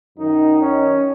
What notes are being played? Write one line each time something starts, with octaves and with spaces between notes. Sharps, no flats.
F#2 D#3 D#4
C#4